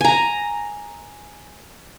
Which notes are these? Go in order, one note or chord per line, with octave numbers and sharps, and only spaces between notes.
G#5 A#5